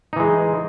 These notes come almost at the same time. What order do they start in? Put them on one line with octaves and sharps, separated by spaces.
D#4 E3 G#3